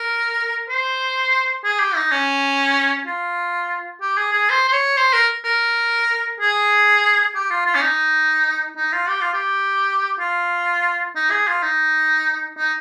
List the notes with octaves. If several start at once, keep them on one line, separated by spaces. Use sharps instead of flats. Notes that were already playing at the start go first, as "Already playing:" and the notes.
Already playing: A#4
C5
G#4
G4
D#4
C#4
F4
G4
G#4
G#4
C5
C5
C#5
C5
A#4
A#4
G#4
G4
F4
F4
C#4
D#4
D#4
F4
G4
F4
G4
F4
D#4
G#4
F4
D#4
D#4